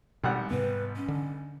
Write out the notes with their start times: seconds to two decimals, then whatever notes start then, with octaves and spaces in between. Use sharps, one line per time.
0.24 G#1 B2 G3 F#5
0.51 G#2 C3 B3 B4
0.96 C#4
1.08 D3